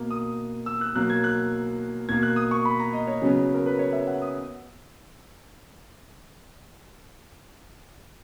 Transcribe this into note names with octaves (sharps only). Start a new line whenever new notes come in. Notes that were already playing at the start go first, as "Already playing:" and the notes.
Already playing: B2 A#3
D#6
E6
F#6
B2 F#3 A#3 F#6
G#6
F#6
B2 A#3 G#6
F#6
D#6
C#6
B5
A#5
D#5
C#5
C#3 F#3 B3
A#4
B4
C#5
E5
F#5
D#6